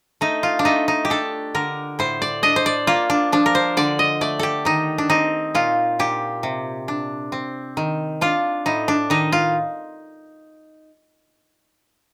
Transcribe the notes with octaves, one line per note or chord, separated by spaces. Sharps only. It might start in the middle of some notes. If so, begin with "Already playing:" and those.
A3 D#4
F4
D4
A3 D#4
D#4
G4
D4 A4
D3 A#4
A2 C5
D5
D4 D#5
C5
D5
A#3 F4
D4
F3 D4
A#4
C5
D3 D5
D#5
A3 D5
G4 A4
D#3 D#4
D4
C4 D#4
A#2 F4
A#2 G4
C3
D4
C4
D#3
D4 F4
A2 D#4
D4
D#3 D#4
F4